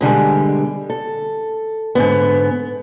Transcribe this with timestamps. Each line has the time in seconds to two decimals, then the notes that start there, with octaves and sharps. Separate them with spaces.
0.01 B2 D3 G3 G#3
0.90 A4
1.95 G#2 D3 B3